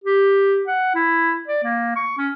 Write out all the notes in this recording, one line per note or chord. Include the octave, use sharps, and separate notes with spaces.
G4
F#5
E4
D5
A#3
C#6
C#4